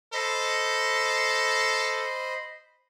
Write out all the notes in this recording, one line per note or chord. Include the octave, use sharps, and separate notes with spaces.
A4 C5 D#5 B5